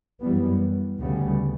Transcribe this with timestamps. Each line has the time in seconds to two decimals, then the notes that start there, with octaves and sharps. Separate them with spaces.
0.21 F#2 E3 G3 B3
1.00 D2 C#3 G3 B3